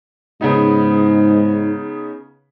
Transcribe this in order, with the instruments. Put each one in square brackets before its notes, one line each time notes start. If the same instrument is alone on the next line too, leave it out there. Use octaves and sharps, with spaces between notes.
[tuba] G#2 [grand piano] C#3 B3 D#4